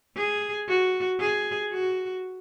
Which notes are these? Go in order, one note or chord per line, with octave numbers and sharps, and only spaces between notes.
G#4
F#4
G#4
F#4